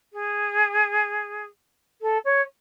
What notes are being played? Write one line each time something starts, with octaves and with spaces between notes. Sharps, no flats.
G#4
A4
C#5